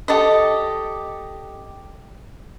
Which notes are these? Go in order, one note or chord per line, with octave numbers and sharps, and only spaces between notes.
G4 A4 D5 D#5